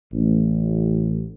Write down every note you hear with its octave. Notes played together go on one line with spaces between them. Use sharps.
A1